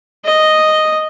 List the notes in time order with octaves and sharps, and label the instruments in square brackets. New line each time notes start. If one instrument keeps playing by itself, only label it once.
[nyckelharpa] D#5